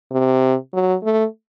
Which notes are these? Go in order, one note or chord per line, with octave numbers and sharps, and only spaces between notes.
C3
F#3
A3